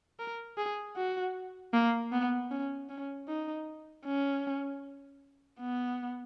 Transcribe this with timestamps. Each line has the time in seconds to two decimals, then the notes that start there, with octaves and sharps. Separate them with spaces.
0.19 A#4
0.58 G#4
0.97 F#4
1.73 A#3
2.12 B3
2.51 C#4
2.90 C#4
3.28 D#4
4.05 C#4
5.60 B3